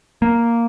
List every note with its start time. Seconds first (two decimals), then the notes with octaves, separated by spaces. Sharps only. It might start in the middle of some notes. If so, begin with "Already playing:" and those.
0.22 A#3